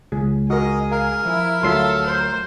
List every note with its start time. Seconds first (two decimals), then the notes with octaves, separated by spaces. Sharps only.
0.12 C#2 G#4
0.50 F#4 G#4 A#4 D#5
0.92 A#4 F5
1.26 F3 E4
1.63 D2 F#3 F4 A4 E5 C6 C7
2.06 C5